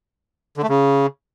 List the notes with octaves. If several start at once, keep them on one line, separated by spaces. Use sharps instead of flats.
D3
A3
C#3